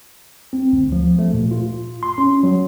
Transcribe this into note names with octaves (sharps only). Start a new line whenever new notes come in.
C4
D2
F3
A3
A#2
F4
C6
C#4
F#3